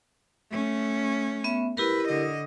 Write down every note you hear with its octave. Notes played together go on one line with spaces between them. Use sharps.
A3 C#4
B3 E5
E4 G4 A#4 B4
D3 D#5